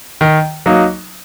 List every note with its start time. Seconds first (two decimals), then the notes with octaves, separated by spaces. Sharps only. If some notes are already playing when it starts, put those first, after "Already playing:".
0.21 D#3
0.66 F#3 A#3 D#4